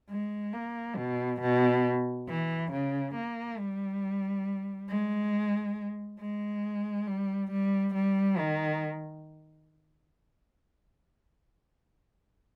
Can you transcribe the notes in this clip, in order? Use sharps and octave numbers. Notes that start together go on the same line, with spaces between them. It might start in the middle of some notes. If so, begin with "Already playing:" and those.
G#3
A#3
B2
B2
E3
C#3
A#3
G3
G#3
G#3
G3
G3
G3
D#3